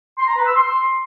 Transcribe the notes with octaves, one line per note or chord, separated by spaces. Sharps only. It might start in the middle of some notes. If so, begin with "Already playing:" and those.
C6
A#5
B4
E6
C6